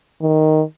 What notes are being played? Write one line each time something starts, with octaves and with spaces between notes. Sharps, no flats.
D#3